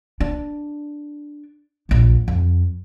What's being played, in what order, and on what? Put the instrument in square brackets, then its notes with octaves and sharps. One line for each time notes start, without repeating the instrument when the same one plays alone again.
[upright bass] D4
A#1 D#2
F2